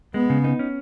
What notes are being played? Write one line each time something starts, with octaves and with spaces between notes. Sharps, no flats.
G#3 B3
C#3
D#4
C#4